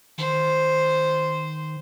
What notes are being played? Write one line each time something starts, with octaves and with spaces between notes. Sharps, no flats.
D#3 C5